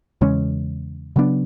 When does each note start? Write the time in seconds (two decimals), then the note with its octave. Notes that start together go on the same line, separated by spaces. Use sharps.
0.21 E2 C#3 G#3 C#4
1.16 C#3 F#3 B3 D4